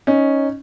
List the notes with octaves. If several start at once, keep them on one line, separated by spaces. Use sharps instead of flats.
C#4 D#4